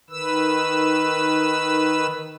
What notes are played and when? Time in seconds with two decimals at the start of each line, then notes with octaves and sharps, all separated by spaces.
0.10 D#3 B4 E6